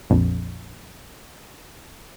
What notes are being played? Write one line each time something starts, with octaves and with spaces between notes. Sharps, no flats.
A#1 F2